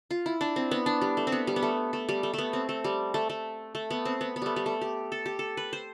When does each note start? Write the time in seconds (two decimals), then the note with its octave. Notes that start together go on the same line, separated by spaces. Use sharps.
0.11 F4
0.26 E4
0.41 D4
0.56 C4
0.71 B3
0.86 D4
1.02 G3
1.17 A3
1.27 C4
1.32 B3
1.47 G3
1.56 B3
1.63 A3
1.93 A3
2.09 G3
2.23 A3
2.34 A3 B3
2.53 C4
2.69 A3
2.84 G3
3.14 A3
3.30 A3
3.75 A3
3.91 B3
4.05 C4
4.21 B3
4.36 B3
4.42 G3 A3
4.56 G3
4.66 A3
4.81 G4
5.12 A4
5.26 G4
5.39 A4
5.57 B4
5.73 C5